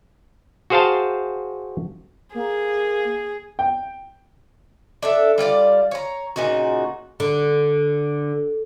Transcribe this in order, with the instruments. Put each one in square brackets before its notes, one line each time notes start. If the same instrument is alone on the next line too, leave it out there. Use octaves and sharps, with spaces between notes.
[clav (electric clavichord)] F#4 G#4 C5 F5 G5 A5
[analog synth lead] A#3 [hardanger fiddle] G#4
[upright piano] G5
[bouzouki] D4 A4 E5
G3 F4 D5 F5
C#5 A#5
A#2 C#3 D#4 F#4
[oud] D3